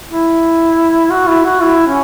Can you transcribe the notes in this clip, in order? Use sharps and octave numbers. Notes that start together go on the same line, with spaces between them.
E4
F#4
E4
F#4
E4
C#4